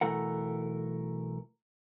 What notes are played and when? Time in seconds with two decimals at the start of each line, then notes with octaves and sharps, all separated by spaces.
0.01 B1 E3 A3 A#4 F#5